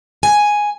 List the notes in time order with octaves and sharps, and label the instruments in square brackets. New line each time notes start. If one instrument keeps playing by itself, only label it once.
[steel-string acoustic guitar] G#5